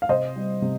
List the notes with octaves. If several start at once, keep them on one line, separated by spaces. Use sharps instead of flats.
F5
C3 C5 D#5
G3
C3